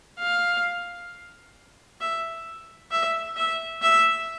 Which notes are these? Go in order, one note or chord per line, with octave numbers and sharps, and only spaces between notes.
F5
E5
E5
E5
E5